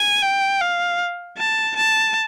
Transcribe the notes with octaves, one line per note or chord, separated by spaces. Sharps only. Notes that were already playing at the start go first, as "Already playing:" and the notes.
Already playing: G#5
G5
F5
A5
A5